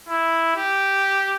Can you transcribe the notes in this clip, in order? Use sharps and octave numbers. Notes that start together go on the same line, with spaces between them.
E4
G4